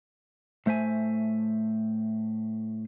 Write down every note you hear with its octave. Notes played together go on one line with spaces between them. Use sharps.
A2 A3 C5 E5 G#5